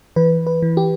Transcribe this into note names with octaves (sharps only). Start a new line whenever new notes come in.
E3 B4
B4
E3
G4